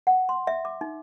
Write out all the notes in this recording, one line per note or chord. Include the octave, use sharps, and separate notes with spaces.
F#5
C6
E5
D6
D#4